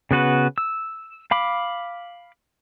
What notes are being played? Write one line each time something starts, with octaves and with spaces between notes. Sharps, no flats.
C#3 B3 F#4 B4
E6
F5 B5 D6